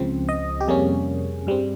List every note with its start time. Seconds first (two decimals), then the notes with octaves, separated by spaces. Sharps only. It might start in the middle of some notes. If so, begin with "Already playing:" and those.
Already playing: C#2 C#3 F3 C4
0.29 D#5
0.60 G4
0.68 F2 C3 G3 A#3 C#4 G#4
1.47 G2 G3 C4